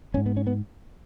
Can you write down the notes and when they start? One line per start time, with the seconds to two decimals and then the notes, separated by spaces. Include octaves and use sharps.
0.14 G#1 C#4
0.17 G#2
0.26 B3
0.37 C#4
0.47 B3